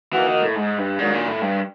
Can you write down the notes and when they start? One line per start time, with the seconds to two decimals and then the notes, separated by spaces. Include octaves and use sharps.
0.13 E3 F3 A#3 D#4 F#4
0.27 D#3
0.42 A2
0.55 G#2
0.78 G2
0.99 G#2 D#3 F#3 A#3 D4
1.13 A#2
1.28 A2
1.41 G2